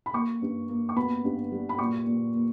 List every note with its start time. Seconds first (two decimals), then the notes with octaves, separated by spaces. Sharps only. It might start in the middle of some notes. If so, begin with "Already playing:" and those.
0.06 B5
0.13 A#3 C#6
0.42 G2
0.69 A#3
0.89 C#6
0.96 B3 B5
1.24 G2
1.52 G3
1.69 B5
1.79 A#2 C#6
2.07 A#2
2.35 A#3